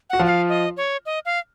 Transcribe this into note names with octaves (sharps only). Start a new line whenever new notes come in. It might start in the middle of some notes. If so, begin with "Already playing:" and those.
F#4 F#5
F3 F4
F#5
F5
D#5
C#5
D#5
F5